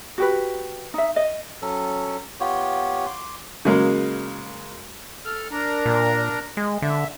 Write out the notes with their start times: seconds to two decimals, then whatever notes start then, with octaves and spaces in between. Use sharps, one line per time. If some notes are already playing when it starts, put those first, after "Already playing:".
0.18 F#4 G4 B4
0.94 D#4 E5
1.16 D#5
1.62 F#3 C#4 A4
2.40 B3 F4 G4 C#5
3.06 C6 D6
3.65 C#3 F#3 G#3 A#3
5.25 A4 F6
5.51 D4 A#4 A#5
5.85 A#2
6.57 G#3
6.82 D3 E5